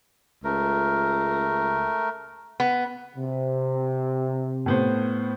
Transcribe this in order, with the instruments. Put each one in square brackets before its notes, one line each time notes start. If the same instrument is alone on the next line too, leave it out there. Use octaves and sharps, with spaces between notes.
[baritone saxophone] C#2 [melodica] A3 A#4
[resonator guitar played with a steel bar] B3
[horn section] C3
[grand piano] A2 B3 C5